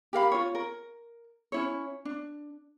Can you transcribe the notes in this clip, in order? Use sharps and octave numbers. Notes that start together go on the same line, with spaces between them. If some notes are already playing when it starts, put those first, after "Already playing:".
G4 A#4 F5 B5
F4 C#5
A#4
C#4 E4 C#5
D4